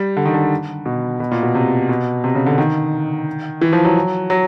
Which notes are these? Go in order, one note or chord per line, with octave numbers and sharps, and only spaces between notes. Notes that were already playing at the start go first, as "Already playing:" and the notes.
Already playing: G3
D3
D#3
D3
B2
B2
A#2
B2
C3
B2
C3
C#3
D3
D#3
E3
F3
F#3
F#3